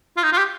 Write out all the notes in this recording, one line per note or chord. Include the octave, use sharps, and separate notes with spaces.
F4
D#4
F4
G4